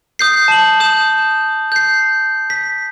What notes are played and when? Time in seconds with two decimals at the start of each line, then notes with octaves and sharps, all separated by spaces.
0.19 D#6 G6 C7
0.48 A5 F#7
0.80 D#6 G6 E7
1.72 G6 C7
2.50 B6